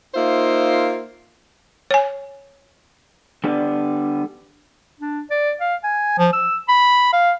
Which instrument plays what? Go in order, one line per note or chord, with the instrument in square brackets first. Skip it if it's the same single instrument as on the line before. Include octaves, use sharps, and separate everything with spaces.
[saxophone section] A#3 D#4 F4 C5 E5
[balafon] C#5 G#5
[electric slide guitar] D3 G3 B3
[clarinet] D4
D5
F5
G#5
F3
E6
B5
F5